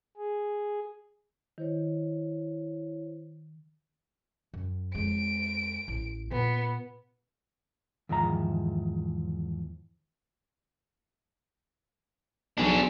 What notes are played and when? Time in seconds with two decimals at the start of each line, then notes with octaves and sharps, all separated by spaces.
0.17 G#4
1.58 D#3 E4 C5 C#5
4.54 F#2
4.95 F2 G#3 D7
5.88 A1
6.32 A#2 B3
8.09 E2 G#2 D#3 F3 E5 A#5
12.58 B1 D4 G#4